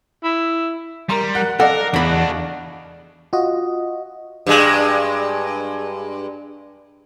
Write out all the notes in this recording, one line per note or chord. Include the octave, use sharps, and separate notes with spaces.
E4
G3 A#4 A#5 C6
A#4 F#5 F#6
A4 A#4 D5 D#5 F5 F#5
E2 D4 F#4 B5
F4 F#4 D#5
G2 G#3